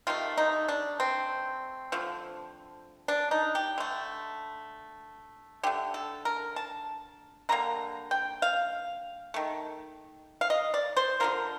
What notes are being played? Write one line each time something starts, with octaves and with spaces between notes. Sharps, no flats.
C3 D#3 A3 F4
D#4
D4
C4
D3 F3 A3
D4
D#4
G4
D3 A3
D3 A3 G4
A4
A#4
A5
D3 G3 A#3 A#5
G5
F5
D#3 A3
F5
D#5
D5
C5
D3 F3 A#3 A#4